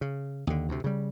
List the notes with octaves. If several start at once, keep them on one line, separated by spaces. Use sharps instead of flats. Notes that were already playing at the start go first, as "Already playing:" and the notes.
C#3
D#2 D3
D2 C3
C#3 G3